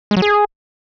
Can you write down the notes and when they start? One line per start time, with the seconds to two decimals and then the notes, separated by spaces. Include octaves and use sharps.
0.11 G#3
0.17 F#3
0.22 G#4